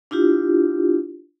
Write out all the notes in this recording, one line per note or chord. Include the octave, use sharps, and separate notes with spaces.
D4 E4 F4 G4